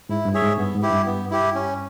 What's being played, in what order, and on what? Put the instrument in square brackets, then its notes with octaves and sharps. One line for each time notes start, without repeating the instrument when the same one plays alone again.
[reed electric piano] G#2 [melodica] E4
[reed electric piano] G2
[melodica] G#4 C#5 E5
[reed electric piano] G#2
[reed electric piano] G2 [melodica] B3
[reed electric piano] G#2
[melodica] E4 G4
[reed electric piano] G2
[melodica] B3
E4 G4
C#4